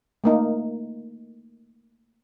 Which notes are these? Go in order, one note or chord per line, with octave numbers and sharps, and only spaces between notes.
A3 A#3 D#4